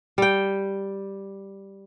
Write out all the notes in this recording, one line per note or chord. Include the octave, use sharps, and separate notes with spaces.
G3 G5